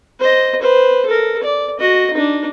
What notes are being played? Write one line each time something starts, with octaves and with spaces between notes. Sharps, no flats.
C5 D#5
B4 C5
A4 A#4
D5
F#4 D#5
D4 D#4